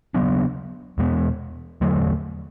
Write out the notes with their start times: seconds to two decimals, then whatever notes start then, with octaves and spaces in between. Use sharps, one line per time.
0.14 C#3 F#3 B3 D4
0.98 E2 B2 G#3 B3
1.81 E2 D3 F#3 A3